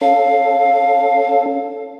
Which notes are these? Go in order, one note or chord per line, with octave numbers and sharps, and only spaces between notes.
C#4 A4 F5